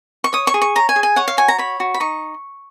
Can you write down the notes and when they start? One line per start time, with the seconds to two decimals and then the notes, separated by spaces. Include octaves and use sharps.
0.24 C#6
0.33 C#5 D#6
0.47 C#6
0.54 G#4
0.62 C#6
0.76 C#5 A#5
0.89 G#5
0.96 G#4
1.03 G#5
1.16 C#5 F#5
1.28 F5
1.37 F#4 G#5
1.48 A#5
1.58 C#5 B5
1.80 F#4
1.94 B5
2.00 D#4 C#6